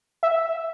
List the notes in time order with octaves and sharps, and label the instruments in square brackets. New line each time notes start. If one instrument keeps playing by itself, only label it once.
[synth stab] E5